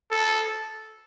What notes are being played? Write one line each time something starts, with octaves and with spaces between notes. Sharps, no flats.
A4